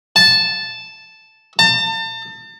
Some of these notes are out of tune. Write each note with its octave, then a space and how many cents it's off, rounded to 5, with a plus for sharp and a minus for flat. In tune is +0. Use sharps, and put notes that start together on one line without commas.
A5 -5
A5 +35